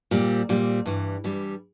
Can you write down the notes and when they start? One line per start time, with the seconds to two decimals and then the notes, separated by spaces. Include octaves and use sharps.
0.11 A#2 G3 C4
0.49 A#2 G3 C4
0.86 G2 E3 G3
1.24 G2 E3 G3